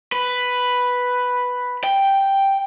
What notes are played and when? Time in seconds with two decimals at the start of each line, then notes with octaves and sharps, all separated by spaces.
0.12 B4
1.84 G5